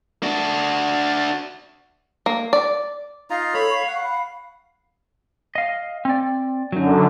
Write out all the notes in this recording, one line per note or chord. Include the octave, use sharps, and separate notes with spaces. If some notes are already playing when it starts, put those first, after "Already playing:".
D4 F#4
A#3
D5
D#4 F4 F5 A#5
A4 C#5 B5
C#6
F#5
B5
D#5 F5
C4 D5
F#2 D3 F#3 D#4